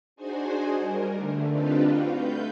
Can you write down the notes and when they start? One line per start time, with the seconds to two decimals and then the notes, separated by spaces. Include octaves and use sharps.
0.16 D4 D#4 F#4 G#4 C5 G#5
0.79 G3 A#4
1.16 D3 A3
1.49 C4 D4 D#4 F4 G4 B4
1.85 F4 F#4 F5
2.13 A3 B4 G6